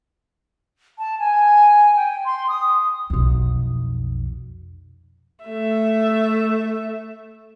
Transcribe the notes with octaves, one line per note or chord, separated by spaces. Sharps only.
A5
G#5
G5
C6
D#6
B1 F2
A3 E5